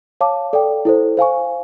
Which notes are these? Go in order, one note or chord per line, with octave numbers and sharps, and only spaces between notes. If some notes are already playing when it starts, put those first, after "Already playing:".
C#5 F5 A5 D6
A4 D5 G5
E4 A4 C5
C5 F5 G#5 C#6